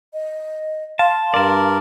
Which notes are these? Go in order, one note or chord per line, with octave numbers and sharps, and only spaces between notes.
D#5
F5 A5 C6
G2 A#4 D5 A5